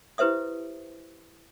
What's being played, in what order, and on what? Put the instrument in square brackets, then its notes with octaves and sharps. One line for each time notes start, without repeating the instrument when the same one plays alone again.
[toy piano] E4 G4 B4 C5 E5 D#6